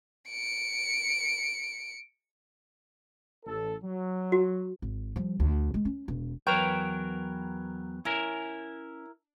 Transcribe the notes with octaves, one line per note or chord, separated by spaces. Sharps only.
C#7 D7
A1 A4
F#3
F#4
G#1
F3 G3
D2
G#3
C#4
E1
E2 F#3 A#4 B4 C#5 G5
C#4 E4 A#4